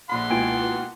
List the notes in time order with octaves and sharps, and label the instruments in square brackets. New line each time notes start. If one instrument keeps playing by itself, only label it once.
[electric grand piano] A#1 A#2 B5 [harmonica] F#5 C6
[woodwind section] C#2 F4 [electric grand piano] B2 A#3 [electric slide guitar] E4 G5 G#5